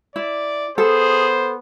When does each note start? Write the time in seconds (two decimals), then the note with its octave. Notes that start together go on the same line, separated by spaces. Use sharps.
0.16 E4 D5
0.78 B3 G#4 A4 C5